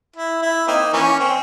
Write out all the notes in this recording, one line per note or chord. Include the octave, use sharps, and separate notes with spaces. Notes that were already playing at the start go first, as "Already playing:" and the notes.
E4
E4
A#3 C4 D#4
E3 A#3 C#4
C4